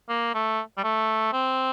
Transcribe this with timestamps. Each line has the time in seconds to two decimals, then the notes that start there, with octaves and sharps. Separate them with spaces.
0.09 A#3
0.34 A3
0.77 G3
0.84 A3
1.33 C4